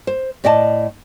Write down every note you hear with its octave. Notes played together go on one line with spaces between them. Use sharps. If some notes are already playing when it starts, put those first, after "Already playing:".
C5
A2 D5 D#5 G5 A5